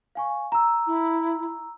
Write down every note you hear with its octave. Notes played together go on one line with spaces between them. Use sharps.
F5 G#5 C#6
A#5 E6
E4